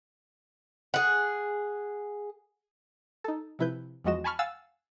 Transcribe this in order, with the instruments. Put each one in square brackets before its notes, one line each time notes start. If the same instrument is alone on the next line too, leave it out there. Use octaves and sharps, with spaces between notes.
[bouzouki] G#4 F#5
[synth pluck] D#4 A4
C3 F3 E4 B4 G6
E2 F3 G#3 F#4 D#5 E7
G#5 A5 B5 C#6 F6
F5 F#5 G#5 E6 A6